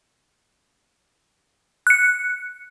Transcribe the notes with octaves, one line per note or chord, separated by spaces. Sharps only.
F#6 C#7